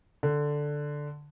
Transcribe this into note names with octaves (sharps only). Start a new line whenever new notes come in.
D3